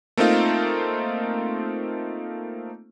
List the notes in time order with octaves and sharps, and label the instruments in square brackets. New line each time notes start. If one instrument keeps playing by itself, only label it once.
[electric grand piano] A3 A#3 C4 D#4 F4